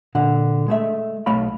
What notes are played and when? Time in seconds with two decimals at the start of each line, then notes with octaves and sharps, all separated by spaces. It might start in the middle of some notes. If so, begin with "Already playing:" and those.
0.15 A#2 D3 F#5
0.68 G#3 A3 E5
1.26 B1 A3 C#5 F5 B5